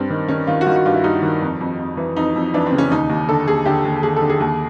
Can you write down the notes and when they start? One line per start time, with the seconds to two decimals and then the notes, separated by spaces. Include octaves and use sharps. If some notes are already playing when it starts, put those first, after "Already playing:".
Already playing: G2 C4
0.10 D#3
0.28 D#3 C#4
0.47 D#3 F4
0.61 F#4
0.66 D#3 F4
0.76 F#4
0.85 G2 F4
0.94 E4
1.04 G2 D#4
1.22 D#3
1.42 F2
1.61 F2
1.79 F2
1.97 E3
2.17 F2 D#4
2.36 F2
2.54 E3 D4
2.66 C4
2.72 C#3
2.78 C#4
2.91 D#2 D#4
3.10 D#2
3.29 D3 A4
3.47 D#2 G#4
3.66 D3 G4
3.85 D#2
4.03 D#2 G#4
4.16 A4
4.22 D3
4.30 G#4
4.40 D#2